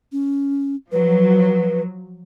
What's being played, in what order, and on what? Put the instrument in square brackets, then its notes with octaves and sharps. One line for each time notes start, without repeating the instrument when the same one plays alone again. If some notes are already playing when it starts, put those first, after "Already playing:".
[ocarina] C#4
[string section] F3 F#3 [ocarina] B4